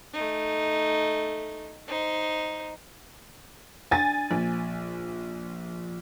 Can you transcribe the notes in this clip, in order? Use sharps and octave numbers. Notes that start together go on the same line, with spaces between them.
A3 D#4
D#4 C5
D4 G#5 A6
A#1